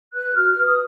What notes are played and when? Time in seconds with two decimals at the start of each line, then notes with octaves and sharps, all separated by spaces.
0.12 B4 F#6
0.35 F#4 F6
0.51 F6
0.58 B4
0.64 D#6